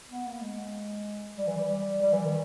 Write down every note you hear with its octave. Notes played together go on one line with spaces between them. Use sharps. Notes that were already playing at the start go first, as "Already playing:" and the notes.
B3
A#3
G#3
G3
E3
G3
G3
E3
D#3